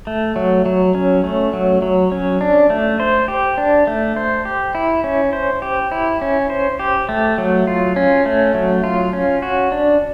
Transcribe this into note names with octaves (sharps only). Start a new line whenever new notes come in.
A3
F#3
F#3
C#4
A3
F#3
F#3
C#4
D4
A3
C5
G4
D4
A3
C5
G4
E4
C#4
C5
G4
E4
C#4
C5
G4
A3
F#3
F4
C#4
A3
F#3
F4
C#4
F#4
D4